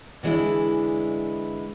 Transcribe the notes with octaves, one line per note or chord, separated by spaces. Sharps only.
D3 E3 G#3 C4 D4 E4